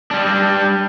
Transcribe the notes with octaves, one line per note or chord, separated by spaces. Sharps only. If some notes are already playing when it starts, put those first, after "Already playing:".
G3 D4